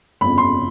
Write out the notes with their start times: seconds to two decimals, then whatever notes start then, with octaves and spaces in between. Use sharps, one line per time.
0.21 G1 F2 C#3 B5
0.38 C6